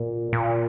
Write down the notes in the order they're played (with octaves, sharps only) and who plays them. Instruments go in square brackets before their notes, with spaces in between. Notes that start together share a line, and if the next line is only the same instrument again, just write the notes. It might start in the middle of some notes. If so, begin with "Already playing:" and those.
Already playing: [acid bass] A#2
A#2